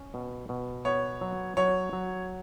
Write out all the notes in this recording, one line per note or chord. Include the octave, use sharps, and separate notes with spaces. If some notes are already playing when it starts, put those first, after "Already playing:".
Already playing: C#4
B2
B2
B3 C#5
F#3
F#3 C#5
F#3